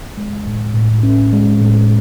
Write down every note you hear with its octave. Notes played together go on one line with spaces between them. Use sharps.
G#3
A2
A2
C#4
G#3
A2